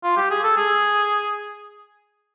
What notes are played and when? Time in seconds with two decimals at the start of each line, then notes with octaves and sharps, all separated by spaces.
0.04 F4
0.17 G4
0.30 G#4
0.44 A4
0.57 G#4